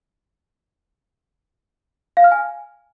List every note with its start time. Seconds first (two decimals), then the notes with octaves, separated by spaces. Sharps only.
2.17 F5
2.24 F6
2.32 G#5